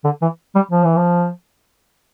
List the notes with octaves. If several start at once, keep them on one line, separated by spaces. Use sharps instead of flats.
D3
E3
G3
F3
E3
F3